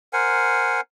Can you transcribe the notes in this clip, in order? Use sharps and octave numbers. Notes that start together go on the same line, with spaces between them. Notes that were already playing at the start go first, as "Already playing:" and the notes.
A#4 C5 F#5 G#5